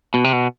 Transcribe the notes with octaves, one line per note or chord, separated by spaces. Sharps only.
B2
C3
B2